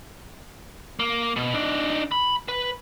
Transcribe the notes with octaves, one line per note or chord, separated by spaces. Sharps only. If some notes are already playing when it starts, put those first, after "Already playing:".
A#3
B2
D4 D#4
B5
B4